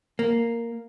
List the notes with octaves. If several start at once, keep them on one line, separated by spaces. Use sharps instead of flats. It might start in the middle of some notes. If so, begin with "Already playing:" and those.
A#3